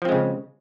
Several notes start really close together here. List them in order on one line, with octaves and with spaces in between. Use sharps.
F3 C4 G#3 C#3